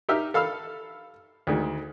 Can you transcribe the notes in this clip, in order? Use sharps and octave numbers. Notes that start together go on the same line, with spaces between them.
D#4 G4 E5 E6 F6
A4 F5 B5 E6 F6
D2 D#3 G#3